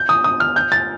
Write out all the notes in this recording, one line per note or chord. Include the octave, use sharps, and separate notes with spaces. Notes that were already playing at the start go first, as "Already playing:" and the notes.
Already playing: G6
D#6
D#6
F6
G6
A6